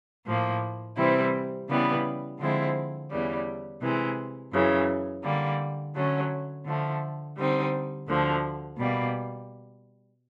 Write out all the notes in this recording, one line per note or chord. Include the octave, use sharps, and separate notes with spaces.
A2 F3 A#3
C3 E3 G3 C4 E4
C#3 E3 G3 B3
D3 F3 G#3 C4 E4
E2 C#3 E3 G3
C3 E3 G#3
F#2 C#3 E3
D3 G3 A#3
D3 F#3 A3 C#4
D3 F3 A3
D3 G3 C4 D#4
D2 D3 F3
B2 G3 A#3